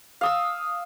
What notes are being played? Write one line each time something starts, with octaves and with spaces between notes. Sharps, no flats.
F5 D#6 E6